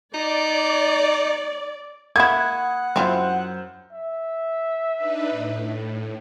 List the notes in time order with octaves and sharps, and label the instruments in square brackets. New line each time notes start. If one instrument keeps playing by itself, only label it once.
[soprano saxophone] D#4 [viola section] D5
[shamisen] A#3 E4 [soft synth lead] F#5 [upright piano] B5 C#6 D#6 [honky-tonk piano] G#6
[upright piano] F#2 C5 [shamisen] C4 E4 F4
[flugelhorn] E5
[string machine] D4 D#4 B4
A2